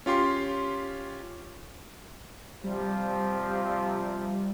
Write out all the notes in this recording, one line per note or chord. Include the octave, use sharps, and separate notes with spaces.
C#4 F4 G4 C6 C7
C3 F3 G3